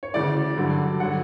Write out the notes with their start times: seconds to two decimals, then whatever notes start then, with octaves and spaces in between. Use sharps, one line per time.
0.03 C#5
0.14 D2 C#3 E3 D5
0.57 G2 D3 F#3
1.00 D3 F#3 F#5